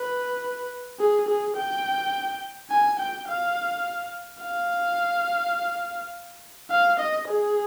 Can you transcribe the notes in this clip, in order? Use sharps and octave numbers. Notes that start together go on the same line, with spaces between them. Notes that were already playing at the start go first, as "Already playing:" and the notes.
Already playing: B4
G#4
G#4
G5
G#5
G5
F5
F5
F5
D#5
G#4